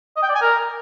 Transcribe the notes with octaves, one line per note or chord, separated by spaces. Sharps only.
D#5
G5
D5
G#5
A#4